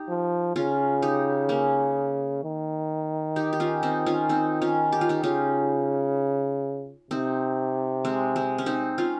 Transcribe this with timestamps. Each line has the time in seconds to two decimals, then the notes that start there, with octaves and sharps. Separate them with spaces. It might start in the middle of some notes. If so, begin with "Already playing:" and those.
Already playing: D#4 G4
0.09 F3
0.56 C#3 C#4 F4
1.02 D#4 G4
1.49 A#3 C#4
2.44 D#3
3.36 D#4 G4
3.53 G4
3.60 C#4 F4
3.83 C4 D#4
4.06 C#4 F4
4.29 C4 D#4
4.62 C#4 F4
4.92 G4
5.01 F4
5.09 D#4 G4
5.23 C#3 C#4 F4
7.11 C3 C4 D#4
8.05 G#3 C4
8.36 G#3 C4
8.58 C#4
8.66 C4 D#4
8.98 C#4 F4